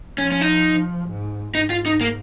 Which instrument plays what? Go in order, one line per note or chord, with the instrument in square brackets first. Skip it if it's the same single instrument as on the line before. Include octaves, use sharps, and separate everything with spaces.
[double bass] F3 [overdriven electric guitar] C#4
[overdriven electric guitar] C#4
D#4
[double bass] G#2
[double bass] G#2 [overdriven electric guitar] D#4
[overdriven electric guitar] F4
D#4
A#3